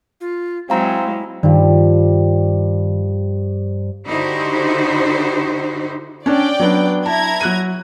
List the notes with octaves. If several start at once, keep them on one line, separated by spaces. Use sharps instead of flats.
F4
F#3 G#3 C4 E4 F5 A#5
G2 D#3 F3 G3
D3 D#4 E4 F#4 G4 C5
C#4 D4 D5 G5
F#3 B3 D4
E4 A5 A#5 G#6
F#3 F#6 D#7